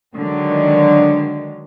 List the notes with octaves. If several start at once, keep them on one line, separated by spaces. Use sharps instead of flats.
D3 D#3 F#3 G#3